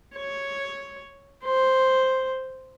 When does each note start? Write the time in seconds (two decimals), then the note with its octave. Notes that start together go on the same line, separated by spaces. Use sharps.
0.17 C#5
1.45 C5